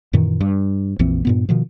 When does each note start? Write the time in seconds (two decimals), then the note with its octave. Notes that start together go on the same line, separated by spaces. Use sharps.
0.13 F#2 A#2 D#3 E3
0.41 G2
0.99 A#1 F2 E3 C4
1.25 G2 A#2 B3
1.49 B2 D#3 F3